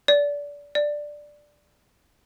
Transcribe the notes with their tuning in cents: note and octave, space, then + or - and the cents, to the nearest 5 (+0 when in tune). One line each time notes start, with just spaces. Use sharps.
D5 -25
D5 +5